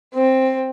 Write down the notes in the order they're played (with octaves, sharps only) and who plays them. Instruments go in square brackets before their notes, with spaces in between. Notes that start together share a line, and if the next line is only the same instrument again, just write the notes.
[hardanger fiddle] C4